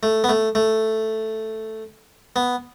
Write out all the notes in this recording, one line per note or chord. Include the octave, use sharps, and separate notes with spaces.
A3
B3
A3
A3
B3